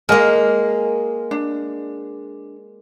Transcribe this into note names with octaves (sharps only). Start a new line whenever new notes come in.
G#3 A#3 A#4 D#5 G#5
D4